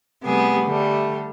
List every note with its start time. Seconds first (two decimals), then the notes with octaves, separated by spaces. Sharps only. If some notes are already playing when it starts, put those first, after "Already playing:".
0.23 C3 G3 A3 B3 G#4
0.65 D3 G3 A3